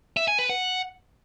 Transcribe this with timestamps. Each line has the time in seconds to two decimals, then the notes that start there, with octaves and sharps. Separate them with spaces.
0.17 E5
0.28 G#5
0.39 B4
0.49 F#5